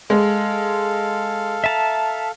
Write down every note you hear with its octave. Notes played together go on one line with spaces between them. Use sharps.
G#3 A4 F5
E5 A5 A#5